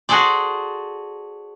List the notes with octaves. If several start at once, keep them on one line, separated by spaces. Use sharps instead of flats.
F#4 G#4 A4 C5 D5